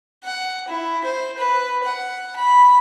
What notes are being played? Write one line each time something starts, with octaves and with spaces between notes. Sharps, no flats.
F#5
E4
C5
B4
F#5
B5